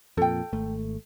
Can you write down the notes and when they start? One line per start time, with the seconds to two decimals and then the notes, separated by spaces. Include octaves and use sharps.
0.17 F2 A#2 A4 G5
0.53 G#1 A3